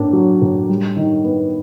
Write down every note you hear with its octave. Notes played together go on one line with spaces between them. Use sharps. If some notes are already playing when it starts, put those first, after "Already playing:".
Already playing: A2 A#3 D4
F#3
A2
G3
D#3
B3